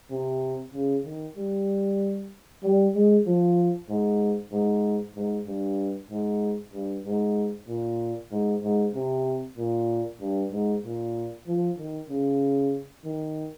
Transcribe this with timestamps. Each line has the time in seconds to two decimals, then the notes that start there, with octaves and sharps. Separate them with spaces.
0.11 C3
0.73 C#3
1.05 D#3
1.37 G3
2.63 G3
2.95 G#3
3.26 F3
3.89 G#2
4.52 G#2
5.16 G#2
5.47 G2
6.10 G#2
6.73 G2
7.05 G#2
7.68 A#2
8.31 G#2
8.63 G#2
8.95 C3
9.57 A#2
10.20 G2
10.52 G#2
10.83 A#2
11.47 F3
11.78 D#3
12.09 C#3
13.04 D#3